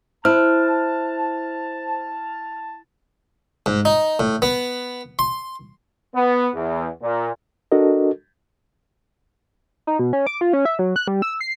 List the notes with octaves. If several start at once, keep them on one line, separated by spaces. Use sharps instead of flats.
E4 C5 A5 F6
G#2
D#4
A2
B3
C6
B3
E2
A#2
D4 F#4 A4 A#4 D#5
D#4
B2
C#4
D6
F4
C#4
E5
F#3
F#6
G3
E6
C7